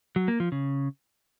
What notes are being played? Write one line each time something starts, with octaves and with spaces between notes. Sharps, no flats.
F#3
A#3
F3
C#3